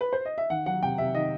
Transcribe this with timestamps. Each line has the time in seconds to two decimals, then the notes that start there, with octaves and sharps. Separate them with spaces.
0.01 B4
0.13 C5
0.25 D#5
0.38 E5
0.50 D#3 F#5
0.66 F#3 F#5
0.82 C3 G5
0.98 C3 E5
1.14 D#3 D#5